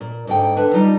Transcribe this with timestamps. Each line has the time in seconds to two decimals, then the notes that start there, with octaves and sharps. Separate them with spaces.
0.01 A#2
0.27 G#2 D3 G5
0.57 D3 B4
0.73 G3 D#4 F4